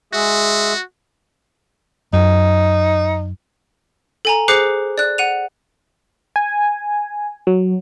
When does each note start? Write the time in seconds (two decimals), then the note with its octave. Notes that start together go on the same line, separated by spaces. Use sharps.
0.13 G#3 F#4 G#4 E5
2.13 F#2 D#4
4.25 A4 G#5 A#5
4.48 G#4 C5 D6 F#6 C7 C#7
4.98 D5 F#6
5.18 F#5 D#7 F7
6.36 G#5
7.47 F#3